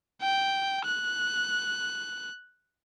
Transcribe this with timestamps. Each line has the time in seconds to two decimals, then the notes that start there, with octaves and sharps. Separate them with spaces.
0.22 G5
0.85 F#6